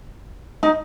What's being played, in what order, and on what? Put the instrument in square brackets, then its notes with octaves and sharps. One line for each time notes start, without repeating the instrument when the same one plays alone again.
[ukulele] D#4